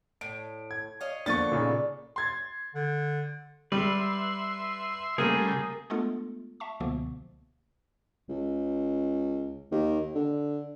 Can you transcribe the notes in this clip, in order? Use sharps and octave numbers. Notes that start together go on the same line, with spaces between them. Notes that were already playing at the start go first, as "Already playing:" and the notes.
A2 D7
G#6
C#5 D#5 F5
D3 F3 A#3 B3 D4 A4 C#6 A6
A#2 C#3 D#4
C6 G#6 A6
D3
G3 B4 E5 C6
C#3 G3 A3 A#3 G#4 G#5
G#3 A3 B3 D4 F4 A4
E5 A5 C#6
C#2 B2 D3 F3 A#3 B3
C#2
D#2
D3